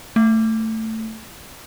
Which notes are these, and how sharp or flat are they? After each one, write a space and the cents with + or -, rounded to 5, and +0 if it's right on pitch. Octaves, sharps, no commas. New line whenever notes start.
A3 +15